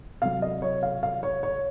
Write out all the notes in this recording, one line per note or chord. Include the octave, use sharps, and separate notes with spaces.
C3 F#3 F5
D#5
C#5
F5
F5
C#5
C#5